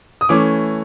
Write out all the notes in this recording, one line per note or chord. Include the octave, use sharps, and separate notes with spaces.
D#6
E3 A3 C#4 D6